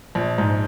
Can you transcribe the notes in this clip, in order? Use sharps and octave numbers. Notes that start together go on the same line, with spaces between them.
A#1
G#2